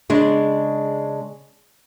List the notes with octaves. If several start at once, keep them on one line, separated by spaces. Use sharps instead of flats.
C#3 G#3 D4